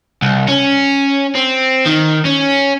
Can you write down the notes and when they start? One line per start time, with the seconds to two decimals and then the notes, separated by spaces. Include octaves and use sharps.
0.22 C2
0.48 C#4
1.35 C4
1.86 D#3
2.25 C#4